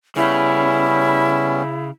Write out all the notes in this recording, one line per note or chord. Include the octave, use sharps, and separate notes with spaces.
C#3 G3 B3 C#4 E4